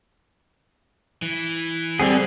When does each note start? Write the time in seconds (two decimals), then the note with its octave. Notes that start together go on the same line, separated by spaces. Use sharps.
1.22 E3
2.00 G3 C4 G#4 A4 F#5